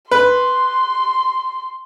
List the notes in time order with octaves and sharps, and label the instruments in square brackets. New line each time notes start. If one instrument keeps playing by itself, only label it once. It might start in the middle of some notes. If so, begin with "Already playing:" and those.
[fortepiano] B4 [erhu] C6